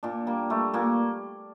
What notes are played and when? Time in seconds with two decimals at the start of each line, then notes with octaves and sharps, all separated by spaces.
0.03 A#2 D4
0.27 G3 A#3
0.50 G3 A3
0.74 A#2 A#3